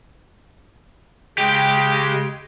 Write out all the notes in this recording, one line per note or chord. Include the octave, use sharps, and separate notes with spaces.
C#3 G#3 G4 G5